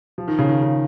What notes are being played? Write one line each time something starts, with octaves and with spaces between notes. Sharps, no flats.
F3
D#3
C#3
D#3
C#3